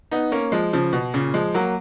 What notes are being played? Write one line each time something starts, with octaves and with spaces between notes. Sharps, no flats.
B3 D#4
A#3 C#4
F3 G#3
C#3 F3
B2
A#2 C#3
F3 G#3
F#3 A#3